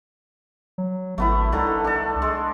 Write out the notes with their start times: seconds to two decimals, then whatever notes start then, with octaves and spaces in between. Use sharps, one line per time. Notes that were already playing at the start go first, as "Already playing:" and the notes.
0.78 F#3
1.18 G#1 A3 B3 E4
1.52 C2 D3 D#3 A4
1.84 D4 A4
2.22 G#3